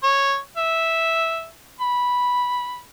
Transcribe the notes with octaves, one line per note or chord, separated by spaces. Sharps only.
C#5
E5
B5